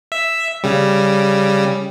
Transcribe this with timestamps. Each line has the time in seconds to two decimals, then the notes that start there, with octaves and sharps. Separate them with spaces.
0.12 E5
0.63 C#3 G3